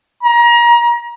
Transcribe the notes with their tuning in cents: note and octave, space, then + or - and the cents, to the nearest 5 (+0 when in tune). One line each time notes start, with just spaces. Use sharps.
A#5 +30